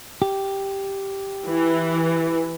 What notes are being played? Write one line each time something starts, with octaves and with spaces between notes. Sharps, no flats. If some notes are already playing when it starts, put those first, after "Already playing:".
G4
E3